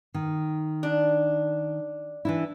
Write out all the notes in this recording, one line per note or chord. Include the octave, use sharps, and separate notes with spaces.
D#3
D4
E3 D4 E4